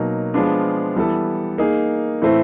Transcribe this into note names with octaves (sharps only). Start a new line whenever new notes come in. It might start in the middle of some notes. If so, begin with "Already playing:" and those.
Already playing: B2 F#3 A#3 D#4
F3 G#3 B3 D4 F4
E3 G3 B3 E4 A4
A#3 D#4 G#4
A2 E3 A3 C4